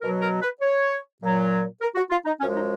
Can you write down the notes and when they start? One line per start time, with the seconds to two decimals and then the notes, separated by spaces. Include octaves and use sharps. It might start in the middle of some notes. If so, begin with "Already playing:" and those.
0.02 B2 F#3 A#4
0.22 A#4
0.42 B4
0.61 C#5
1.21 A#2 F#3
1.81 A#4
1.95 F#4
2.10 F4
2.25 D#4
2.40 F#2 F3 G#3 C#4
2.55 D#4